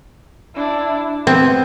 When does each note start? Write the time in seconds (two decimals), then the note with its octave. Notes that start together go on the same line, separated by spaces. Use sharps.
0.55 D4 E4
1.27 B3 C4